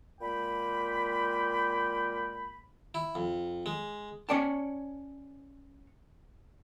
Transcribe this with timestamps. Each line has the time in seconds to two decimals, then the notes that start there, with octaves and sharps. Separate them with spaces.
0.21 A#2 G#3 A#3 G5 B5
2.94 E4
3.15 F2
3.66 G#3
4.29 C#4 C#5 D5 G5 A5